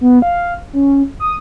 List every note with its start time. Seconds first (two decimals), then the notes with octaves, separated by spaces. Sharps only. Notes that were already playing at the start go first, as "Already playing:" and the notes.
0.01 B3
0.22 F5
0.73 C#4
1.20 D#6